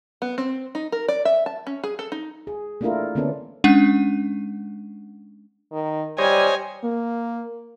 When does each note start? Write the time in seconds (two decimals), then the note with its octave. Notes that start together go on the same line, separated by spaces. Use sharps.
0.22 B3
0.38 C4
0.75 D#4
0.92 A#4
1.08 D5
1.25 E5
1.46 A5
1.67 C#4
1.84 G#4
1.99 A4
2.12 D#4
2.47 G#4
2.81 A3 A#3 D4 E4 F4 A#4
3.15 D3 A#3 B3 C#4 D4 A4
3.64 G#3 C#4 D4 F#5 D#7
5.72 D#3
6.18 G3 C5 C#5 D#5 G#5
6.84 A#3